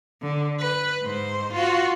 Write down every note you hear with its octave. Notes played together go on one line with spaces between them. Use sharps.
D3
B4
G#2 C5
F4 F#4